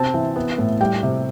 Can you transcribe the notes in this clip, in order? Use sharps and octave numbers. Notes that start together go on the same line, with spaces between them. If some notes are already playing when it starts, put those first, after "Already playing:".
Already playing: C3 C4 A5
E3
B3
A2
G3 G5
C3